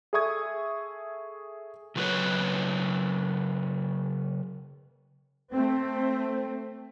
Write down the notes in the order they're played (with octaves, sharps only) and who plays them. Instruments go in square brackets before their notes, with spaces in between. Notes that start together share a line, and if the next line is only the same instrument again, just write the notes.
[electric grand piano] G#4 A4 E5 C#6 D#6 G#6
[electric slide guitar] C#3 F#3 F4 F#4 B4 C#5
[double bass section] A3 C4